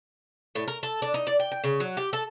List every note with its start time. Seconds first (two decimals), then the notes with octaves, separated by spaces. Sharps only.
0.55 A2
0.68 A#4
0.83 A4
1.02 D4
1.14 D#4
1.27 D5
1.39 G5
1.51 G5
1.64 C#3
1.80 F#3
1.97 G4
2.13 A4